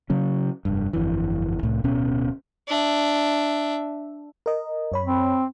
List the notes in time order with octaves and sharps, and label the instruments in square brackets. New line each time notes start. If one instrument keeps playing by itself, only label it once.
[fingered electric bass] C#3 F#3 C#4
F1 G2
G1 F2 E3
C2 A2
D1 B2 B3 C#4
[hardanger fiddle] D4 E5
[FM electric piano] A#4 D#5
F#2 C#5 B5
[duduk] C4